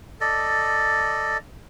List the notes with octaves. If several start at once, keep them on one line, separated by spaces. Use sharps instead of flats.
A4 D5 D#5